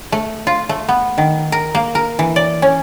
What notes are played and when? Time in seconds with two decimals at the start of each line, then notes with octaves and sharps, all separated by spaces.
0.12 A3
0.47 F4
0.69 A3
0.89 B3
1.18 D#3
1.52 A#4
1.75 A#3
1.95 A#4
2.19 E3
2.36 D5
2.62 C#4